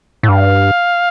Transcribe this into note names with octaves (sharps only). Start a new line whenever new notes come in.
A2
G2 F5